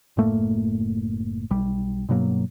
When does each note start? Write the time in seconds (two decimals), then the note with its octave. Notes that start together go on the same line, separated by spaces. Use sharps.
0.17 F#1 A2 A3 A#3
1.50 B1 G3
2.09 G2 B2 F#3 A#3